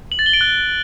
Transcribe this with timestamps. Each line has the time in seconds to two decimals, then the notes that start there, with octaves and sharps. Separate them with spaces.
0.12 F#7
0.19 A6
0.26 G7
0.33 D7
0.41 F#6